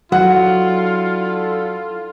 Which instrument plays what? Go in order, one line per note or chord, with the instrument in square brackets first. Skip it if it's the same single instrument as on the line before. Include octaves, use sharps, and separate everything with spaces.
[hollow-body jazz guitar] F#3 [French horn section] D4 E4 A4 [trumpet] F4 [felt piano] F#5